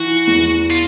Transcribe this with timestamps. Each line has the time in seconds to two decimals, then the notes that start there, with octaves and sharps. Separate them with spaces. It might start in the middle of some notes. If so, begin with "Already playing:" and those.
Already playing: E3 F#4
0.27 E2
0.70 F4